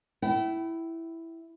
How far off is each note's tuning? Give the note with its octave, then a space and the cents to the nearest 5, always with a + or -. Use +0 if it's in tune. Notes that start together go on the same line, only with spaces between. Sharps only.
E4 +0 G5 -40